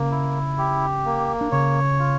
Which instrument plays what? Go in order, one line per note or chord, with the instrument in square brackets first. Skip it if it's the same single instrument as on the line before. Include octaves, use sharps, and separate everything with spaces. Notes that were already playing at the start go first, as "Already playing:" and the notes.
Already playing: [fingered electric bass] C#3 C#4 [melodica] A#3
[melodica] E4
G4
A#3
[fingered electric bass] D4
[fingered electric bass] C#3 C#4 [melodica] C#5
[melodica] F4